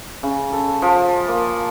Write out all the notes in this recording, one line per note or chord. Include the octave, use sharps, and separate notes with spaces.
C#3
A4
F3
A#3